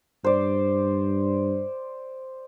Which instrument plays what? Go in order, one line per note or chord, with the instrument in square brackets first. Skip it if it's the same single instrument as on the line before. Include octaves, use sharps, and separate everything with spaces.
[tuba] G2 [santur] C5 D5